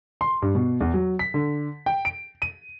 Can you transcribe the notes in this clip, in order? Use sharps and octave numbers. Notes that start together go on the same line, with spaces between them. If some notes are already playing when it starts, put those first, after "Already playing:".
C6
G2
B2
E2
F#3
B6
D3
G5
D7
D#7